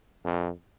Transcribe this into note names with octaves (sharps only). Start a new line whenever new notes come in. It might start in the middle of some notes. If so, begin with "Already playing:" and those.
F2